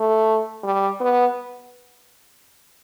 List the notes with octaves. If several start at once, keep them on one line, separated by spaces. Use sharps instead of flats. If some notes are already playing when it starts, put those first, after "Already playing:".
Already playing: A3
G3
B3